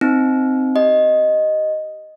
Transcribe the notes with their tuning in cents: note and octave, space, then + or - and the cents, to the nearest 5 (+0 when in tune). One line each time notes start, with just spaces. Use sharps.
C4 +0 D#4 +0
G4 -10 D#5 +0